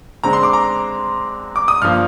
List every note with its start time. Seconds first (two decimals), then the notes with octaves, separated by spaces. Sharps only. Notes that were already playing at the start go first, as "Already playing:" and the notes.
0.23 D3 G#3 C4 A#5
0.33 C6
0.43 D6
0.53 A#5
1.56 D6
1.68 D#6
1.82 G2 F3 A#3 F6